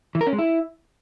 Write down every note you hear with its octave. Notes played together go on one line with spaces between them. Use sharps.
E3
A#4
C#4
G#3
E4